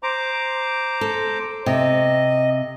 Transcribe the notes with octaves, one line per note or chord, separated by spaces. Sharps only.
C5 A#5 D6
A4
C3 D#5